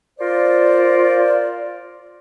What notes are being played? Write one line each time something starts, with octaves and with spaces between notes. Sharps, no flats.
F4 A#4 C5 D5